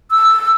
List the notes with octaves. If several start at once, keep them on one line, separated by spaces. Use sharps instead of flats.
E6